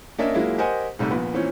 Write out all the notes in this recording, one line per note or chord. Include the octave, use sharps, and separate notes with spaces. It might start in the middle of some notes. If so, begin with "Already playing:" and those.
A#3 C#4 D4 A#4 D#5 E5
F#3 G#3 A#3 E4 F4
G4 A#4 C5 D#5 F#5 G#5
G#2 C3 G3 A3
A#1 A#2 B3
A#2 E3 C4 C#4